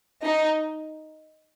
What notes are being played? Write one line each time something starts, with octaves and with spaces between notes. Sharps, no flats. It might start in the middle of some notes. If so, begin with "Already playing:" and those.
D#4